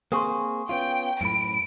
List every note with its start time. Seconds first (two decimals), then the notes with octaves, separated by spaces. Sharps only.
0.12 A#3 C4 G#4 C6 C#6 D#6
0.69 B3 C#4 F4 G5
1.21 F#2 A2 B5 D7